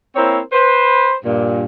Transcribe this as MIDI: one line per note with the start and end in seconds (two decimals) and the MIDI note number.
0.15 0.39 58
0.15 0.39 60
0.15 0.39 64
0.15 0.39 70
0.15 0.39 72
0.15 0.39 73
0.52 1.15 71
0.52 1.15 72
1.24 1.64 43
1.24 1.64 46